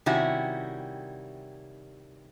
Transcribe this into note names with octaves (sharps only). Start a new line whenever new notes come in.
C3 D#3 G3 C#4 E4 F#4